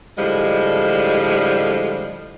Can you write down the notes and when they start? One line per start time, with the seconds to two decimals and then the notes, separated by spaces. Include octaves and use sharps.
0.18 A2 D3 F3 G3 G#3